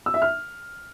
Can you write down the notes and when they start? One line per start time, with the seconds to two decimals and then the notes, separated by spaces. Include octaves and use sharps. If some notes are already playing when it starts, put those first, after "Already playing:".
0.06 E6
0.14 E5
0.22 F6